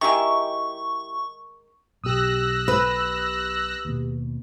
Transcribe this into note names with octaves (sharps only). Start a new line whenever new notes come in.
D#3 G#3 E4 G4 E5 C#6
B1 B2 G4 D#6 E6 F#6 A#6
B4
D#2 B2